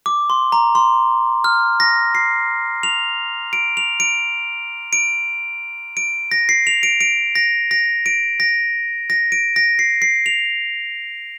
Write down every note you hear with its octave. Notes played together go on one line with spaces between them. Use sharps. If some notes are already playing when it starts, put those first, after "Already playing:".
D6
C6
A#5
C6
F6
A#6
C7
F7
D7
F7
D7
D7
D7
A#6
C7
F7
D7
D7
A#6
A#6
D7
A#6
A#6
D7
A#6
C7
C7
F7